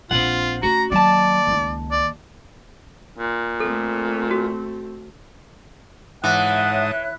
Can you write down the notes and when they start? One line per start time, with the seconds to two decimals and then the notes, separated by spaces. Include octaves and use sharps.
0.11 A#1 C4 F4 F#5
0.63 A3 C#4 F#4 A#5
0.92 D#2 F#3 D5 A5
1.47 C#2 D#3
1.91 D5
3.19 A#2
3.60 A3 C4 A4
4.31 F#4
6.24 G#2 E3 C#5 E5 F#5 A5 D#6 F#6